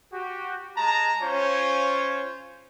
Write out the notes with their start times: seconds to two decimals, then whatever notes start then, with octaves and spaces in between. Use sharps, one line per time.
0.13 F#4 G4
0.77 G#3 A5 A#5
1.22 C#4 F4 C5 C#5